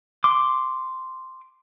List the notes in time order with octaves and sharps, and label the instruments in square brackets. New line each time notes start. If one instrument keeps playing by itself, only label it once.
[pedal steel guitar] C6 D6